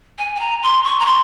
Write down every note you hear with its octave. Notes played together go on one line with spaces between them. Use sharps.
G#5
G#5
A#5
C6
C#6
A#5
C6